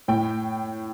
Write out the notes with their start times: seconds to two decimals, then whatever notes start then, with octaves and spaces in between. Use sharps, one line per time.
0.08 A2 G5